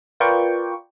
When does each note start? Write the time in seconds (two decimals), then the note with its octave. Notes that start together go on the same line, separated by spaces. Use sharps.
0.20 F4 A#4 B4 D5 G5 C#6